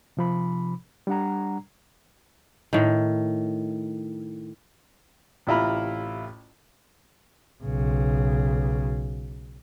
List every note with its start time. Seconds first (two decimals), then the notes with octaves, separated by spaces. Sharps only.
0.17 C3 F3 B5
1.07 G3 D4 F#5 A#5
2.73 A2 D#3
5.47 A1 C3 E4 F4 A#5 B5
7.64 B1 C#3